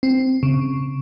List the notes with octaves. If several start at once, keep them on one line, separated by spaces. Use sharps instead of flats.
C4
C#3